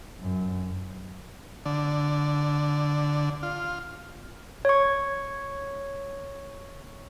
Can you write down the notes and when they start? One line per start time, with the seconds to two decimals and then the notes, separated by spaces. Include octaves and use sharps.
0.19 F#2
1.66 D3
3.43 F4
4.65 C#5 C#6